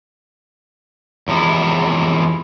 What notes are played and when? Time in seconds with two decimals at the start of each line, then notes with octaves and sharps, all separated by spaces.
1.28 E2 C3 F3 G#3 E4